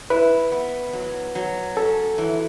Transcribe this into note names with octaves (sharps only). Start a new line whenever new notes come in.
E4 B4
B3
F#3
F#3
C#4 A4
E3